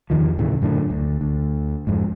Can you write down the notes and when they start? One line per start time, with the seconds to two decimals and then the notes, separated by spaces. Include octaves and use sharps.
0.10 E2 D#3 F3
0.38 D#2 A2 C#3 E3
0.62 F#2 A2 D3
0.90 D2
1.21 D2
1.87 F2 G#2